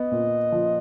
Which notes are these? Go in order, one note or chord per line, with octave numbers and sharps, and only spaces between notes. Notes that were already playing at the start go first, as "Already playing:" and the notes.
Already playing: B3 D#5
A#2
F3